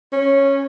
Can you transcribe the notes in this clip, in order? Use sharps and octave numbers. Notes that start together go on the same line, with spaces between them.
C#4